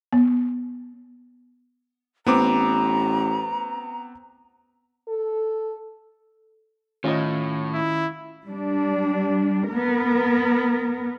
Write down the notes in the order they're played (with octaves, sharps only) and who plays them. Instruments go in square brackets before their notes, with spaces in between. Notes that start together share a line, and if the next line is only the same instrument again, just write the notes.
[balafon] B3
[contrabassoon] A1 [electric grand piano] B3 C4 D6 [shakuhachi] A#5
[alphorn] A4
[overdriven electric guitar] A2 [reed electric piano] D#3 C#4 F5 [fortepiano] F4 D#5
[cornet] E4
[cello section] G3 D4
B3 A#4